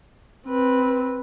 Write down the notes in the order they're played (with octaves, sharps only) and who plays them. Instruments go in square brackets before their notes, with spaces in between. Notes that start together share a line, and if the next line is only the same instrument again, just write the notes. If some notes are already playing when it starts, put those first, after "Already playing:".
[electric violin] C4 B4